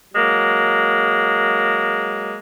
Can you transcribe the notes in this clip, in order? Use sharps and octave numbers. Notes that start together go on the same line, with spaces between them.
F#3 G#3 A#3